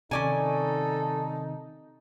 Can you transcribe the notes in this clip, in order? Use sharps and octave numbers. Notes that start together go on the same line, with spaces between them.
C3 D#3 C#4 D#4 A4 D5 G#5